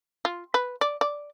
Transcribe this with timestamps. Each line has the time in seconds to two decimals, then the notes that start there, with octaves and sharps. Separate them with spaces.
0.25 F4
0.54 B4
0.81 D5
1.01 D5